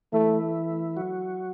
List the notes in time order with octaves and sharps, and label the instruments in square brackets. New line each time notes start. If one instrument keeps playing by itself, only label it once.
[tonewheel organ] E3 E4 [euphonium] A3
[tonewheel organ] F#3 F#4